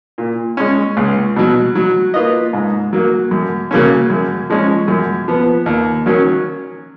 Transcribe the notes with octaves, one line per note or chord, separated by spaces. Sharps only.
A#2
G#3 C#4
C#2
B2 F#3
F#3
A#3 F4 B4 D#5
G#2
F#3 A#3
F#2
C#3 F#3 A#3 C#4
F#2
F3 G#3 C#4
F#2
F3 B3
D#2
D#3 F#3 C#4